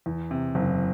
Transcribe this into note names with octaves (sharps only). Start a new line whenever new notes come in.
E2
C3
F#1